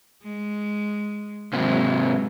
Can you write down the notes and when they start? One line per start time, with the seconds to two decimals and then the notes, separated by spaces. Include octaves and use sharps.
0.23 G#3
1.53 G#2 C3 E3 F#3 G#3